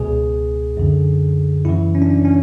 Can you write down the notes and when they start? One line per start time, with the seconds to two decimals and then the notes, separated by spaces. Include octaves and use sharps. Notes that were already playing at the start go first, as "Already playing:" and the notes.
Already playing: C#2 B2 G#4
0.77 F#2 D3
1.65 F#2 C#3 E3 E4
1.95 C#4
2.02 D4
2.10 C#4
2.25 C#4